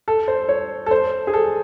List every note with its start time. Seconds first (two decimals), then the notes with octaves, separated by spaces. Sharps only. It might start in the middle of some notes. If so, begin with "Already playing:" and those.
0.08 A4
0.28 C5
0.49 C#5
0.86 A4
0.91 C5
1.27 G#4
1.33 A4